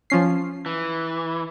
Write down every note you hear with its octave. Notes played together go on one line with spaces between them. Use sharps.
F3 C#4 C7
E3